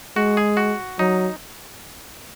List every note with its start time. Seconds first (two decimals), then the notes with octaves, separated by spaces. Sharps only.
0.16 G#3 F#4
0.37 G#4
0.57 F#4
0.99 F#3 D#4